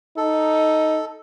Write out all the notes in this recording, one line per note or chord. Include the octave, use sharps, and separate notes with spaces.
D#4 A4